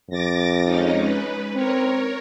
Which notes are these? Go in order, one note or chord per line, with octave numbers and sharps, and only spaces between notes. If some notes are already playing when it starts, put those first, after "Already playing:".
F2 D6 A6 A#6
G#3 C#4 D#4
B4
C4 A#4 C#5